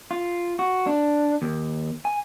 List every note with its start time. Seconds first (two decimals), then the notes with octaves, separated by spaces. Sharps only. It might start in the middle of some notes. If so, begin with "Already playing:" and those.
0.11 F4
0.59 F#4
0.87 D4
1.42 D#2
2.05 G#5